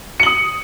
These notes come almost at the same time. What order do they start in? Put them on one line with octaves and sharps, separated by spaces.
C#7 F#7 D#6